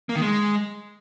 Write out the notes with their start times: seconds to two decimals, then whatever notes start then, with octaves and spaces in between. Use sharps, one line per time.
0.09 A#3
0.15 D#3
0.22 G#3